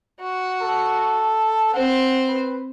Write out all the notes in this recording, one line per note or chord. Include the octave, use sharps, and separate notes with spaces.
F#4
A4
C4 C5 F#5
B4